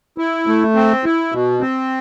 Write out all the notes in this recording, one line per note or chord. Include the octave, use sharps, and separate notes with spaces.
E4
A3
C4
E4
B2
C4